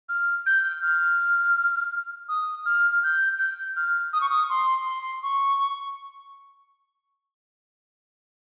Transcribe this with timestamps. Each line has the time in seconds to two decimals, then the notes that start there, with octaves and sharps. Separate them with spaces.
0.09 F6
0.46 G6
0.83 F6
2.29 D#6
2.66 F6
2.91 F6
3.03 G6
3.39 G6
3.76 F6
4.13 D#6
4.21 C#6
4.29 D#6
4.49 C6
4.86 C6
5.23 C#6